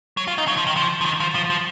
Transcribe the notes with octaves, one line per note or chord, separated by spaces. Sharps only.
F#3
F4
D#4
F#3
F3
D#3
F3
F3
D#3
F3
F3
F3